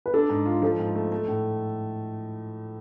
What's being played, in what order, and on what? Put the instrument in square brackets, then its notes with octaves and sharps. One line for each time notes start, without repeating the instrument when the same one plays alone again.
[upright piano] B4
[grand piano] D4 [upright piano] A4
[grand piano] G#2
F4
[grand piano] F3 [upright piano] A4
[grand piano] G#2
A3
A3
A2